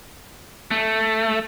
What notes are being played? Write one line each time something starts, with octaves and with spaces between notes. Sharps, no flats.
A3